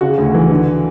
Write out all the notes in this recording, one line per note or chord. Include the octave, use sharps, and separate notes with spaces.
C#3 F#4
D2
E3
D3